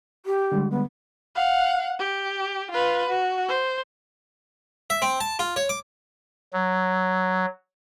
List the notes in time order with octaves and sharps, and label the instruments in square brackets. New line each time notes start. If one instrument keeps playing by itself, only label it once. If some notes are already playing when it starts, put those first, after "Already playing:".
[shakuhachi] G4
[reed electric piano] D3 G3 G#3
[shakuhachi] B3
[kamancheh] F5 F#5
G4
F4 B4
F#4
C5
[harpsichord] E5
C4
A5
F4
C#5
D6
[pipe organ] F#3